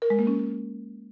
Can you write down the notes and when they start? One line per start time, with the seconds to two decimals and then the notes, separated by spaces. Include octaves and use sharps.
0.02 A#4
0.10 G#3
0.19 A#3
0.27 C#4